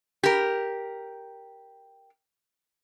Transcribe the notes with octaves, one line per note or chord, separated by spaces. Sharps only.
G4 A#4